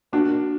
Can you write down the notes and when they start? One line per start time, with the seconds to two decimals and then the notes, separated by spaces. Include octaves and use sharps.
0.13 A#3 D4 F#4